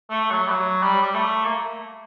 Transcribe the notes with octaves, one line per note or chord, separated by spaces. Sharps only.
A3
F#3
G3
F#3
G3
G3
A3
A#3